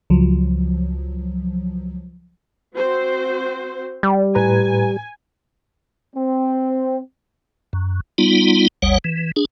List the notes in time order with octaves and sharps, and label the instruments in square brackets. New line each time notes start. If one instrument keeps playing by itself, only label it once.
[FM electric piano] C#2 F3 F#3
[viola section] C4 F#4 C5
[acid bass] G3
[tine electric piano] A2 B4 A#5 [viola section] G#5
[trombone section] C4
[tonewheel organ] F#2
G3 B3 D#4 F4
G#1 D#2 G3 C#5 F#5
E3
D4 G#4